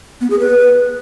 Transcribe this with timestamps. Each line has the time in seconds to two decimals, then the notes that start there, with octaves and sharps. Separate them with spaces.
0.21 B3
0.30 G#4
0.40 B4